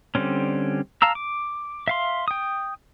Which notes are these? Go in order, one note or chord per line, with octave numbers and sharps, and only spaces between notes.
D3 G3 C4 C#4
F5 A5 A#5 E6
D6
E5 F5 C6
G5 D#6